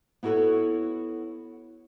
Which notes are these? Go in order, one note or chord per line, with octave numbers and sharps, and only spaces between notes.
B3 E4 F#4 A4 B4 C#5